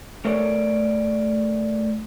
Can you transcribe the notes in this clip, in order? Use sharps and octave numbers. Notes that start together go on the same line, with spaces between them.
A3 A#4 C#5 D5